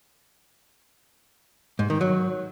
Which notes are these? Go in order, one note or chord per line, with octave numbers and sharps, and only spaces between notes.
G#2
D#3
F#3